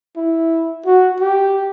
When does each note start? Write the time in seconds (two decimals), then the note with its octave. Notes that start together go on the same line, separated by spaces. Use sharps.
0.17 E4
0.86 F#4
1.20 G4